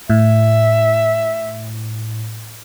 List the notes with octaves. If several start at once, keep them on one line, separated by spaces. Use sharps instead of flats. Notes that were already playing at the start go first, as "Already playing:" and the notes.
A2 E5